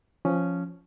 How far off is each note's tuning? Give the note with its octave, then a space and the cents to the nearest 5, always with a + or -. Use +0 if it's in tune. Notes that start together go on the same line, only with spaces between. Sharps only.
F3 +0 C#4 +0